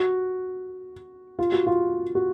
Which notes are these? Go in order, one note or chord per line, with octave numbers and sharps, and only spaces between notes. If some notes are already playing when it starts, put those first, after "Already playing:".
Already playing: F#4
F4
F#4
F4
F#4